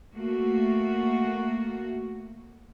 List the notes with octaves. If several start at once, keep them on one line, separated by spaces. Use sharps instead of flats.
A3 A#3 F#4